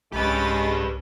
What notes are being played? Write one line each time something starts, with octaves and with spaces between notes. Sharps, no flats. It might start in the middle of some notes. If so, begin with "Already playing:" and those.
C2 G#3 C#4 G4 B4 B5 A6